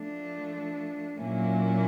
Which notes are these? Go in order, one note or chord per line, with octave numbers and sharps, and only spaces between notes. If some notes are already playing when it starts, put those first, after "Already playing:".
Already playing: F3 A3 D4
A#2 F#3 A#3 C#4 E4